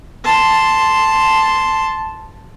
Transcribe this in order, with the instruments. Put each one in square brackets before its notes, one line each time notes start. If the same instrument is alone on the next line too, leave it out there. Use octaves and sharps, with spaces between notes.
[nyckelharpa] A5 C6